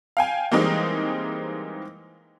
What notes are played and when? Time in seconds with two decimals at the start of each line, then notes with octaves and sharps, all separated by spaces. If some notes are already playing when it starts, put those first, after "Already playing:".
0.17 F5 G5 G#5
0.52 E3 G3 G#3 A#3 C4 D#4